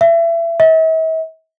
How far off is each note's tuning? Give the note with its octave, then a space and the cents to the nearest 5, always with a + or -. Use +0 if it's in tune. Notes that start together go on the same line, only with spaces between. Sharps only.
E5 +30
E5 -45